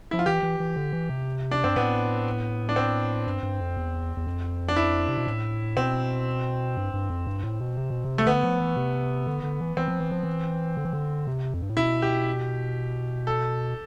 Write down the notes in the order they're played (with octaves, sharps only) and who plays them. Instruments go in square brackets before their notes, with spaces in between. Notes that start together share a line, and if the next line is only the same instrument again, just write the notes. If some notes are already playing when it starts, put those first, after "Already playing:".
[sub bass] F3 [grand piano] E4
[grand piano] F4
[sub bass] E3 [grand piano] G4
[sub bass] E3
E3
D3
E3
C3
[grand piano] D4
[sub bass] G2 [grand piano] C4
[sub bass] A2 [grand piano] B3
[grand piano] D4
C4
[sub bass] G2
G2
F2
E2
E2
F2
[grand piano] D4
E4
[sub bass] C3
B2
A2
[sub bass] B2 [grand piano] C4
[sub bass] G2
G2
F2
G2
A2
B2
C3
B2
C3
[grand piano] A3
[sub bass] D3 [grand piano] B3
[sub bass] F3
E3
C3
D3
D3
E3
[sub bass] E3 [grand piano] C4
[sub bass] F3
E3
F3
E3
D3
E3
D3
C3
F2
G2
A2
[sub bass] B2 [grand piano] E4
[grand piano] G4
A4